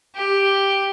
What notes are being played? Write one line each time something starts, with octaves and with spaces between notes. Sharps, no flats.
G4